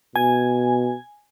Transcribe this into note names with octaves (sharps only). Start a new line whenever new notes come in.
B2 G#5